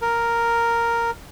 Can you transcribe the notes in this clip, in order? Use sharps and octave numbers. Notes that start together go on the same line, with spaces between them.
A#4